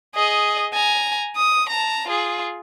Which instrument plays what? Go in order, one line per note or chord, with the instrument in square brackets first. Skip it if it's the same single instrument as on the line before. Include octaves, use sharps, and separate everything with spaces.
[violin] G#4 D#5
G#5 A#5
D#6
A5 A#5
F4 G#4